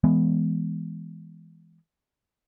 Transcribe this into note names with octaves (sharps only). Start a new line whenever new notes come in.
E3 G#3 B3